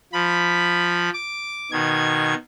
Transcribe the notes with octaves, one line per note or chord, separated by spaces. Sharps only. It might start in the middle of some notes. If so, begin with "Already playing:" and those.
F3 B5
D6
B2 D#3 G#6